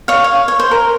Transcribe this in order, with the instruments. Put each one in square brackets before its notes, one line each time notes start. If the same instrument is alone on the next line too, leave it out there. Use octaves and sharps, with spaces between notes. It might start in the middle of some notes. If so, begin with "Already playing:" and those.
[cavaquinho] C#5 F5
C#5
C#5
C5
A#4